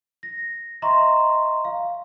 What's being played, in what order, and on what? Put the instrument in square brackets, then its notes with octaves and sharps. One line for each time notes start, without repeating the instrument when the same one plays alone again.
[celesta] A#6
D#5 E5 A#5 C6 C#6
F5